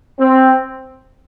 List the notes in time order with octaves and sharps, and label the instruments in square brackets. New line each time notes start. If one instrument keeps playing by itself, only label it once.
[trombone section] C4